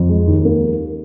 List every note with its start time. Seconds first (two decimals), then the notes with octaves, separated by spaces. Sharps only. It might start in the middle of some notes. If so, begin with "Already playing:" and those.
Already playing: F2
0.09 G#3
0.28 D#2
0.45 A#3